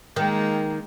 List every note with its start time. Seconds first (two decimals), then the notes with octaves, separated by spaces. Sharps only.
0.16 D#3 G#3 A#3